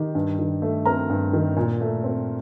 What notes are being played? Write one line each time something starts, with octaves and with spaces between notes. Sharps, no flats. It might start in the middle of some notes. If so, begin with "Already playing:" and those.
Already playing: D#3 G4
G2
D#3
A3
C4 A#4 A#5
G2
D#3
A#2
A3
C4